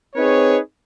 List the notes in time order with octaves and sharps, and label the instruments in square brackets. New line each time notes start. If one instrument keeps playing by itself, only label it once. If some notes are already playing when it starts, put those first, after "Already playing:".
[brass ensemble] C4 D#4 G#4 B4 C#5